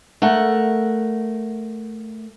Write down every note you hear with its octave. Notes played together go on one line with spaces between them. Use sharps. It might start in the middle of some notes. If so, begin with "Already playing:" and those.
A3 A#4 F#5